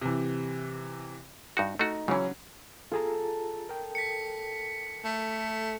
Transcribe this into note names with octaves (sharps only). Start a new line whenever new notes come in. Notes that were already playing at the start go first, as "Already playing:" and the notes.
C3 E3
G2 D#4 F#4
A3 D#4 F#4
C#3 E3 F#3 C#4
F4 G#4 A4 A#5
A#4 G5
B6 C#7
A3